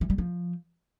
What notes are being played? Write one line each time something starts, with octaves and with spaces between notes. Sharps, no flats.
E3
G3
F3